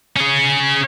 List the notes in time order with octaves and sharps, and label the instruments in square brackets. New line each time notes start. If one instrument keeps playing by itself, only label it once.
[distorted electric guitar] C#4 G#4